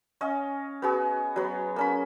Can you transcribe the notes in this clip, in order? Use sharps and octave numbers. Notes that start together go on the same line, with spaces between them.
C#4 C#5 D#5 F5
B3 F#4 G#4
F#3 B3
A#3 C#4 B5